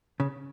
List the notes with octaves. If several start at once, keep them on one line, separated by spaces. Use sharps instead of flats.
C#3